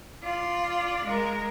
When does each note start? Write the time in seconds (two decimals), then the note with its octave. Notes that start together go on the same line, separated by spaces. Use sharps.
0.23 F4 D5
1.05 G#3 A#4